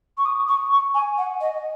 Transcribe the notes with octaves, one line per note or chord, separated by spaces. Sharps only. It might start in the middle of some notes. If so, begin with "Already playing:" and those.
C#6
D#6
C#6
C#6
G#5
F#5
D#5